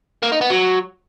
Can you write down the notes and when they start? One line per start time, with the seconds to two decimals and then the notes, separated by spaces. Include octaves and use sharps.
0.23 A#3
0.32 D#4
0.41 B3
0.50 F#3